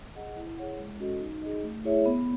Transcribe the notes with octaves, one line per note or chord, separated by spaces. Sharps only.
G#4 D#5 F#5
E4
G#4 C#5 F#5
G#3
C#4 F#4 A4 D#5
D#4
G#4 D#5
A3
E4 G#4 C#5 E5
B3